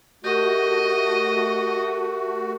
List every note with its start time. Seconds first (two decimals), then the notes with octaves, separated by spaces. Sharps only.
0.24 A3 F#4 G4 A#4 D#5